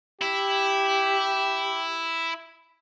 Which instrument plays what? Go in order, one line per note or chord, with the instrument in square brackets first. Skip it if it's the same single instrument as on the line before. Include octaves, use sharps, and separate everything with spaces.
[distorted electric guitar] E4 [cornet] G4